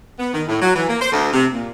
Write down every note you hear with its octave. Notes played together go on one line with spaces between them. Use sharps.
B3
D#3
A2
F#3
E3
A#3
C5
D2
C3
A#2